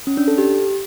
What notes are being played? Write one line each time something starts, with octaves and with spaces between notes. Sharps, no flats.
C#4
D4
A4
G4